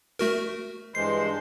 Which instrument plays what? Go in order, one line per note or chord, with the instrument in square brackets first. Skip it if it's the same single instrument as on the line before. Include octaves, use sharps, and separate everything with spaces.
[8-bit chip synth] A3 F#4 A#4
[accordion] G2 E3 G#3 [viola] C5 [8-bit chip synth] C7